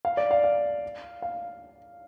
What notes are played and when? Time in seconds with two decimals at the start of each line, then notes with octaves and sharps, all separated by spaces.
0.05 F5
0.17 D5
0.31 F5
0.44 F5
1.22 F5